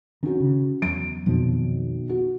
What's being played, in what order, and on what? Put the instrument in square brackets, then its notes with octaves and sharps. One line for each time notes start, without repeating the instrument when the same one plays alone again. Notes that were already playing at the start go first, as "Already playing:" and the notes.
[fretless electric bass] D#3 [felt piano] C#4 F#4
[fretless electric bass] C#3
[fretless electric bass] E2 F#3 [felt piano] D7
[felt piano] B1 [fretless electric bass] F2 D#3 F3
[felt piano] F#4